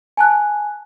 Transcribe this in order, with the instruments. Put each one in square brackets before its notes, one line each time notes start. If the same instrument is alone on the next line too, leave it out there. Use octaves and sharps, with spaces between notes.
[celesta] G#5 A5 F#6